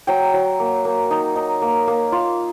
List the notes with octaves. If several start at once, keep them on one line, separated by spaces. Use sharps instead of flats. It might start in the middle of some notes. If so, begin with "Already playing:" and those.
F#3 G5
F#3
A#3
A#3
D#4
D#4
A#3
A#3
F4